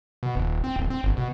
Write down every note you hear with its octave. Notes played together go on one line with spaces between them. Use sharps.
B2
D#1
C4
D1
C4
G1
B2